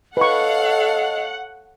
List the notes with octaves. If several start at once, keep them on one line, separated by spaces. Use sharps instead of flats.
A4 B4 C#5 D#5 F5 F#5 C#6